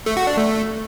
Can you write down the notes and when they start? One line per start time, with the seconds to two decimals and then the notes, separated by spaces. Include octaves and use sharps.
0.06 A3
0.17 F#4
0.27 D4
0.37 A3